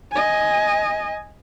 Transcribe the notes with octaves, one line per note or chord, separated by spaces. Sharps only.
D#5 G#5